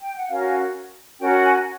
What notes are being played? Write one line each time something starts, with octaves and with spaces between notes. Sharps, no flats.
G5
F#5
C#4 F#4 A#4 F5
C#4 F#4 A#4 G5
G#5